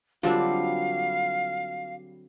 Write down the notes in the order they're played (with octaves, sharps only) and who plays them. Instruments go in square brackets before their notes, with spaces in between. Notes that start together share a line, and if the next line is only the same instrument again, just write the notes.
[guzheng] D3 C4 D4 [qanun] F#3 G3 [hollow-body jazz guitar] F4 [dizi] F5